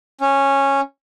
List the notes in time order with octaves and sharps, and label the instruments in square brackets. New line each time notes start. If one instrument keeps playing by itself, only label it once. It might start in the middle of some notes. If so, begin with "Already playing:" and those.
[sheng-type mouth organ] C#4